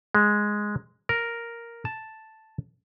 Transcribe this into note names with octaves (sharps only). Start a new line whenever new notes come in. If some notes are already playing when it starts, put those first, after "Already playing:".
G#3
A#4
A5